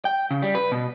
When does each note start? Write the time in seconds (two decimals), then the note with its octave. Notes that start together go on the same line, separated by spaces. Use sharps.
0.05 G5
0.31 C#3
0.42 G3
0.55 B4
0.72 B2